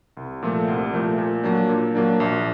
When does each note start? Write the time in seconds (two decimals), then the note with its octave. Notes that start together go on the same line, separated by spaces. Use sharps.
0.17 C2
0.42 A#2 F3 A3
0.68 C2
0.93 A#2 F3 A3
1.18 A#2
1.44 F#3 A#3 D4
1.69 A#2
1.95 F#3 A#3 D4
2.20 A#1